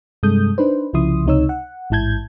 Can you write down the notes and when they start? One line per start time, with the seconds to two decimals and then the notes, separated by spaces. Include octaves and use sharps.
0.23 G2 C3 G#3 A4 D#6 G6
0.58 D4 D#4 B4 C5
0.93 C2 C#3 F3 E4 C6 D#6
1.26 C#2 C3 D#4 C#5 E6
1.49 F#5
1.90 A1 G#2 E4 A5 G6 G#6